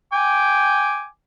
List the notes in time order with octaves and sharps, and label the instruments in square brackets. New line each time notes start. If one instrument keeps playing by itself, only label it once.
[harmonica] G5 G#5 D6